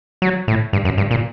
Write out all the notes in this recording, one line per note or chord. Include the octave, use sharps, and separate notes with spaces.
F#3
A2
G2
F#2
G2
A#2